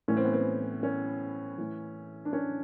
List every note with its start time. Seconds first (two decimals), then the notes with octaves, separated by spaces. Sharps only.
0.08 A2 E3 C#4
0.17 C4
0.25 B3
0.33 C4
0.83 C#4
1.58 A2 E3
2.25 D4
2.33 C#4